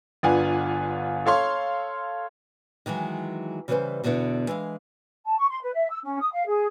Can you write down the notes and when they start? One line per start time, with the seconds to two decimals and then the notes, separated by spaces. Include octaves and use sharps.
0.23 G1 D4 F4 B4 F#5 G#5
1.26 A4 C#5 F5 C6
2.86 D#3 E3 F#3 G#3
3.68 C#3 E3 G3 G#4 B4 C5
4.03 E2 B2 D3 B3 E4
4.48 E3 G#3 F5
5.26 A5
5.38 C#6
5.49 C6
5.62 B4
5.74 E5
5.91 E6
6.03 C#4
6.20 D#6
6.32 F5
6.47 G#4